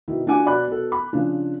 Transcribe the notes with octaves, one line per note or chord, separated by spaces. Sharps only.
B2 D#3 E4
D4 F4 F#4 F#5 G#5 D6
B2 D5 B5 F#6
B2 A4
B5
C#3 F3 D4